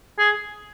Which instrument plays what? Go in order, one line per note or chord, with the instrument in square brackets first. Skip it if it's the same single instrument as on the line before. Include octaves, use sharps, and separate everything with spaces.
[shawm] G#4